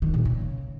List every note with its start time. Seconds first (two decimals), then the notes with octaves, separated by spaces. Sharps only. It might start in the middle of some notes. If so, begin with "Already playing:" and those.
0.02 D#3
0.14 A#2
0.25 C#3